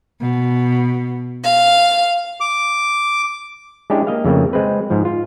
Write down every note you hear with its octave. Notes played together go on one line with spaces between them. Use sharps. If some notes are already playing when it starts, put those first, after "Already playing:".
B2
F5
D6
G#3 C#4 D4 E4 G4
A#3 D#5 F5
F2 C#3 A3 A#3
G#3 C4 B4
G#2 F3
F4